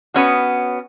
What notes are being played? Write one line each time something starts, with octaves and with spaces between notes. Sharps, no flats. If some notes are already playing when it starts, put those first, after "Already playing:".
B3 C#4 F#4